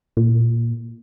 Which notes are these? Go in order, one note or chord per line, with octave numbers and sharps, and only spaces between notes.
A#2